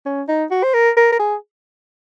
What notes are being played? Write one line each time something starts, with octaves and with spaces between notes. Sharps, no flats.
C#4
D#4
F#4
C5
A#4
A#4
A#4
G#4